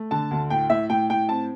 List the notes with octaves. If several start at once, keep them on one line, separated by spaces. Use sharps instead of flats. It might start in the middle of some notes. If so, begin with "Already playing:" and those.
Already playing: A3
D3 A5
D2
A2 G5
A2 E5
A2 G5
A2 G5
C4 A5